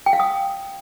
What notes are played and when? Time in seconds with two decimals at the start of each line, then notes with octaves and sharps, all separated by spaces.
0.06 G5
0.13 F5
0.20 D#6